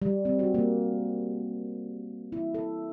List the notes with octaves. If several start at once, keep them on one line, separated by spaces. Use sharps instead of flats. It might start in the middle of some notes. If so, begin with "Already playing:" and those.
G3
C4
F#4
A#3
E4
A4